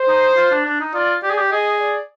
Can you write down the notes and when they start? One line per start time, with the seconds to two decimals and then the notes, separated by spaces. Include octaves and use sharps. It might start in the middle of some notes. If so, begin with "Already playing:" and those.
Already playing: C5
0.08 D#4
0.37 F4
0.51 D4
0.66 D4
0.80 D#4
0.94 F4 D5
1.23 G4 D5
1.30 G#4
1.38 G4
1.52 G#4 D#5
1.80 D5